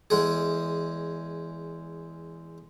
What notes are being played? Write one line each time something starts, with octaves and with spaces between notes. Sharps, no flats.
E2 G#3 G#4